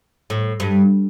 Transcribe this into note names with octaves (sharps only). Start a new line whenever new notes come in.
A2
G2